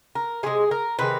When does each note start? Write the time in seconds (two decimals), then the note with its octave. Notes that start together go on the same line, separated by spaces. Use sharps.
0.15 A#4
0.43 C3 F3 G#3 G#4
0.71 A#4
0.99 C3 D#3 G#3 B4